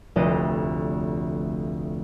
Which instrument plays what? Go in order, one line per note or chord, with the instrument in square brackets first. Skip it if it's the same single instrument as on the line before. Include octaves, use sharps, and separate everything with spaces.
[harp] F1 D2 D5 D#5